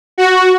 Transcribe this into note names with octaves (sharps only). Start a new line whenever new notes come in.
F#4